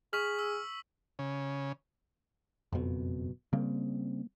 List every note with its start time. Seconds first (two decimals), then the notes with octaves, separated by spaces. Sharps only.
0.13 G#4 C#6 F6 B6 F#7
0.39 E6
1.19 C#3
2.72 F#1 F2 B2
3.53 C#3 G3 A#3 C4